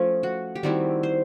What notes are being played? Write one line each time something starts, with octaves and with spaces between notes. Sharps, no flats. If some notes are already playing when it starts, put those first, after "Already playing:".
Already playing: F3 A3 C#4
F#4
G4
D#3 G3 C4 E4 F#4
C5